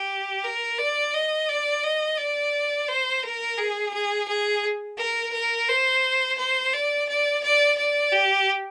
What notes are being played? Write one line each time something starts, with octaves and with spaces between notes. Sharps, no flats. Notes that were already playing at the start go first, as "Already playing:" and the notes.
Already playing: G4
A#4
D5
D#5
D5
D#5
D5
C5
A#4
G#4
G#4
G#4
A#4
A#4
C5
C5
D5
D5
D5
D5
G4